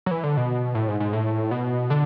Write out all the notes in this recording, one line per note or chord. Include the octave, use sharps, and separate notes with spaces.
F#3
E3
D3
B2
A2
G#2
G#2
A2
B2
D3